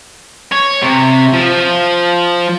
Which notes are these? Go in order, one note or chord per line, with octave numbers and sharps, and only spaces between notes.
C#5
C3
F3